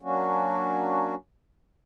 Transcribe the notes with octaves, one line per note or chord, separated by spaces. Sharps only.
F#3 A#3 C#4 D4 F#4